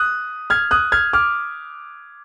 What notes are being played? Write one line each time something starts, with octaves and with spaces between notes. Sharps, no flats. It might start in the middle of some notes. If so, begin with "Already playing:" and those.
Already playing: D#6 F#6
F6 G#6
D#6 F#6
F6 G#6
D6 F6